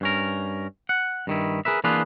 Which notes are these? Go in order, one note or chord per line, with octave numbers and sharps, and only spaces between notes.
G2 C#4 A#4
F#5
G2 D#3 E4
G#4 A#4 B4 E5
E3 A#3 D4 F4 G#4 B4